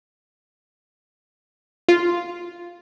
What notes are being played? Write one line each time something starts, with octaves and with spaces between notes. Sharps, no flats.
F4